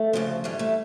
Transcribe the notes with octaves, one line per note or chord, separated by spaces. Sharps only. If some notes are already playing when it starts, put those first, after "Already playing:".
Already playing: A3
D2 C#3 F3
G#2 E3 G3 A3
A3